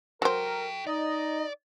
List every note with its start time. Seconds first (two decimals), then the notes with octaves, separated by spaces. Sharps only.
0.22 F#3 A4 A#4 C5 G5
0.87 D#4 D5 D#5